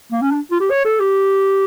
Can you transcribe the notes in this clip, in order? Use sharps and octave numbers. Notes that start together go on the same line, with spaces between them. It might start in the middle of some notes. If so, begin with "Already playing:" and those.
A#3
C#4
D4
F4
G4
C#5
A4
G4